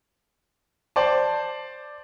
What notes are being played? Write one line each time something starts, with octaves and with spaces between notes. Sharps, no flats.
C5 D5 A5